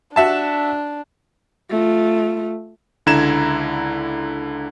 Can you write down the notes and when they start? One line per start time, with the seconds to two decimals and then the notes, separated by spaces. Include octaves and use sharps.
0.16 D4 F#4 E5 A5
1.70 A3 F4
3.06 C#2 D3 E4 A#5 G#6 E7